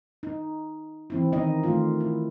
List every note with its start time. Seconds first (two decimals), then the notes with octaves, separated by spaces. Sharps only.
0.23 D#4
1.10 E3 C4 E4
1.32 D#3 B3 D#4 D#5
1.63 D#3 A3 F4
2.00 E4